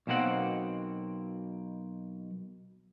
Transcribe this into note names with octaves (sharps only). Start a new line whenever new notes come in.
B1 B2 A#3 C4 F#5